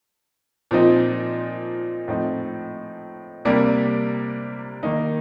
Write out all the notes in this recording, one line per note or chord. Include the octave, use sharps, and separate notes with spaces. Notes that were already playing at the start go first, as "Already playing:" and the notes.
A#2 F3 C4 D#4
A2 F3 C4 D#4
C3 G3 A#3 D4
D#3 A#3 D#4